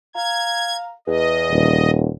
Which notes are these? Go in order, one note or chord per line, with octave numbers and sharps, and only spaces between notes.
F5 A#5 G#6
E2 D#5
D#1